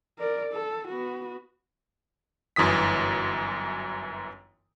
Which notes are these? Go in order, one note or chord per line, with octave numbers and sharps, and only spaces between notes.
A#4 D5
A4
B3 F#4
G1 F#2 E3 D#6 B6